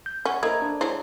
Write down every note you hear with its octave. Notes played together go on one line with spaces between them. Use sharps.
G6
C#4 D5 F#5 C#6
A#3 E4 A4 C5 D#5 A#5 G#6
D4
F#3 G#3 E4 C5